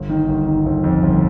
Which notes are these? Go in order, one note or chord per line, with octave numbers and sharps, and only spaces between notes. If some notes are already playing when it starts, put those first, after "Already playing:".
Already playing: G1
D#3
G1
D#3
G1
F2
G1